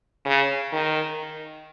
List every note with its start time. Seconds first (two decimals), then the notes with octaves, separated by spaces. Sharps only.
0.26 C#3
0.72 D#3